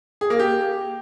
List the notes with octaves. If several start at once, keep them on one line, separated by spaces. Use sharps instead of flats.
G#4
A#3
G4